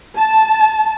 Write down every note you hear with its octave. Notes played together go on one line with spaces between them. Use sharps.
A5